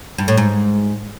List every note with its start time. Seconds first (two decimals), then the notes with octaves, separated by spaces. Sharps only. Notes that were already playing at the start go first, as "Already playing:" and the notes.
0.18 G2
0.28 A2
0.37 G#2